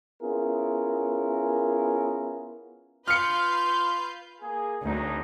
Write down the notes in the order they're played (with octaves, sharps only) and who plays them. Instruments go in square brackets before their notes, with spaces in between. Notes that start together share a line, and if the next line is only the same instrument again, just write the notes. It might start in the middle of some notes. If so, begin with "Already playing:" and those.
[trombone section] B3 C#4 E4 F4 G#4 A#4
[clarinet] F4 [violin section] B4 F5 G6 [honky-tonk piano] F6 C#7
[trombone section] A#3 G#4
[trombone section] G#1 F#3 D#4 [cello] D2